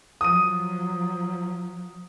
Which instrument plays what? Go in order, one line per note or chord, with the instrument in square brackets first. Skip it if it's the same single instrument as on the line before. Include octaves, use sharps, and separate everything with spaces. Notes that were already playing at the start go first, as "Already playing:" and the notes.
[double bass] F3 F#3 [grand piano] D#6 D#7